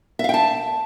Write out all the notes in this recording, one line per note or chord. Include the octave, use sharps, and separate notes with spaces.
E5 F5 G5 A5